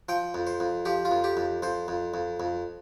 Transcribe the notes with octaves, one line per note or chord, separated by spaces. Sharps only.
F3 G5
F2
C5
F2
F3 G4
F4
F2
G4
F2
F2 C5
F2
F2
F2